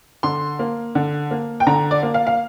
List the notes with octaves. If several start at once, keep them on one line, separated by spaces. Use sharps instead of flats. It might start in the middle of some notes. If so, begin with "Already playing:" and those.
D3 C6
A#3
D3
A#3
G5
D3 A#5
D5
A#3
F5
F5